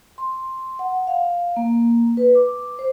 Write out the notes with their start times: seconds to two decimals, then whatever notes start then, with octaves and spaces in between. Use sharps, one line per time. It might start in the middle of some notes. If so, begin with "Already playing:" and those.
0.18 C6
0.79 F#5
1.07 F5
1.56 A#3
2.17 B4
2.35 D6
2.79 C5